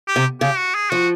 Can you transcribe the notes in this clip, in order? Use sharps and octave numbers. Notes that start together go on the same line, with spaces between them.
G4
C3
C#3 G4
F#4
G#4
F3 F#4